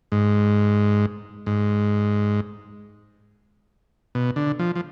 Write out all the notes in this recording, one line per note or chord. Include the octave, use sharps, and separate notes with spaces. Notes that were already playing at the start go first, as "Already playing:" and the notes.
G#2
G#2
B2
D3
F3
F3